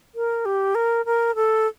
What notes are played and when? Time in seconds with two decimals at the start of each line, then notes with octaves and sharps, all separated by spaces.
0.15 A#4
0.45 G4
0.75 A#4
1.05 A#4
1.35 A4